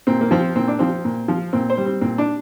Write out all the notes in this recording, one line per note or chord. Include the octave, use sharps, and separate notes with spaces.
A#2 C4
A#3
F3 C4
A#2 C4
D4
F3 C4
A#2
F3
A#2 C4
C5
G3
C4
A#2 C4
D4